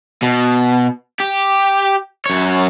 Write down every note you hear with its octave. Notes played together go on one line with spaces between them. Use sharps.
B2
G4
F#2 C#5